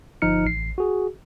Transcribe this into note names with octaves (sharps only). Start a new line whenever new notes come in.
G1 F3 D#4 F6 C#7
A1 C7
F#4 G#4